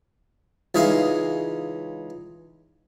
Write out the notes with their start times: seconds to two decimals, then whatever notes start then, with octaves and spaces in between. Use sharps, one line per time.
0.75 C#2 E3 G#3 D#4 F5